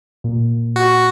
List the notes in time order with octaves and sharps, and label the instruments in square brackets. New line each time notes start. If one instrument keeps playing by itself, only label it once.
[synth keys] A#2
[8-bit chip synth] F#4